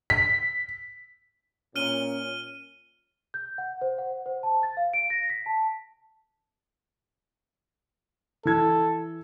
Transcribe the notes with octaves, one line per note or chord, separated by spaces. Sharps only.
B6
A#2 C#4 F6 D#7 G7
G6
F#5
C5
F#5
C5
A5
A6
F5
D7
A#6
B6
A5
E3 A4 G#6